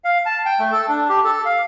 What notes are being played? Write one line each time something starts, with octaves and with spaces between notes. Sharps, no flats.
F5
A5
G5
A3
A4
D4
G4
A4
F5